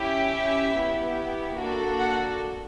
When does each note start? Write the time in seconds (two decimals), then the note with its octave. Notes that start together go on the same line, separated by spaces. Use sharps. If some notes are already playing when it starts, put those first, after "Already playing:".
Already playing: C#4 E4 G4
0.32 E5
0.73 B3 E4 G4
1.57 A#3 D4 F#4 A4
1.99 F#5